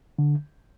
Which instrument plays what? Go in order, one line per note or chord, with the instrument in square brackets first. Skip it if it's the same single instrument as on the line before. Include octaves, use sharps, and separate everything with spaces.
[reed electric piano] D3